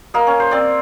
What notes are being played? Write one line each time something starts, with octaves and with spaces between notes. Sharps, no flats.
A#3 D#5
C#4
C5
C4 D5